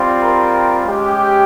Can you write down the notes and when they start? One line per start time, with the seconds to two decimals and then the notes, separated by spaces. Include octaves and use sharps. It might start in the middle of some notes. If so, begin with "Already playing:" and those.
Already playing: G3 C4 F4
0.23 G4 A#4
0.85 G#3 C#4 G4